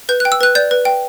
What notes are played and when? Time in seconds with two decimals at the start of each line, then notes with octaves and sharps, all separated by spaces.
0.09 B4 G6
0.20 F#6
0.25 G5
0.32 E6
0.41 B4 F#6
0.55 D5 G6
0.71 B4
0.85 G5